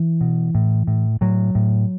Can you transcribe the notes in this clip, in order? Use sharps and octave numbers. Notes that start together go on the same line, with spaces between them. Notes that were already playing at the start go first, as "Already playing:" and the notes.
Already playing: E3
B2
A2
A2
A2 F#3
A2